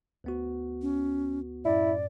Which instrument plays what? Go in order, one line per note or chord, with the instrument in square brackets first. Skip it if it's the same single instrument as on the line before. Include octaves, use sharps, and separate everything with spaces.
[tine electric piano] D2 B3 F#4
[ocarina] C#4
[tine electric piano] F#2 A2 [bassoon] E4 [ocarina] D5